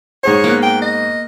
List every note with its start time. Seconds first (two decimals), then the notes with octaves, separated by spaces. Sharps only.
0.23 G#2 G#4 C5 C#5
0.44 A#3 B3
0.63 G5
0.82 D#5